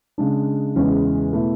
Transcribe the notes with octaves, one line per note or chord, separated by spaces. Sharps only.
C#3 G#3 D4
E2 C#3 G#3 C#4 E4
B2 A3 E4